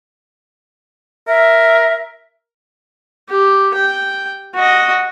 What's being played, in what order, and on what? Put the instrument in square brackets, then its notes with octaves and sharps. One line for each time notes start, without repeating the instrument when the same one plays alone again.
[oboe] A#4 [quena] E5
[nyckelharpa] G4
G5
F#4 D#5